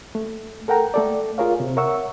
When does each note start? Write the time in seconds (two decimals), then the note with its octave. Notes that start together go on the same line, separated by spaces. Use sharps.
0.15 A3
0.68 A4 A#4 F#5 G5 A#5
0.94 A3 A4 D5
1.38 F4 G#4 A#4 C#5 F5
1.60 C3 C4
1.77 A#4 C#5 E5 F#5 C#6 E6